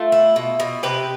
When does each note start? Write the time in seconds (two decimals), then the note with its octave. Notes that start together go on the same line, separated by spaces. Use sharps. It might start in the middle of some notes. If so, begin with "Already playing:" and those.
Already playing: A3 F4
0.12 E4
0.36 B2
0.60 B2
0.83 C3 G4 B4